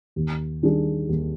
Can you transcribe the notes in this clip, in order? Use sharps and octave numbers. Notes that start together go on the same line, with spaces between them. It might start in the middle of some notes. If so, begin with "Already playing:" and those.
D#2
D#3 G3 D4 G#4
D#2